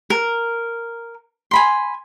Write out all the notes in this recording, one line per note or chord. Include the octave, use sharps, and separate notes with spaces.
A#4
G#5 B5 C6